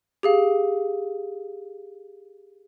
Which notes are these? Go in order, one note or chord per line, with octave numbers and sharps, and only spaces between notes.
G4 G#4 F5